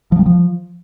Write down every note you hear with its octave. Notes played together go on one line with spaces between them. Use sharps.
F3
G3
F3